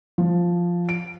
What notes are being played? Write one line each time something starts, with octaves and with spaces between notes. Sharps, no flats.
F3
D7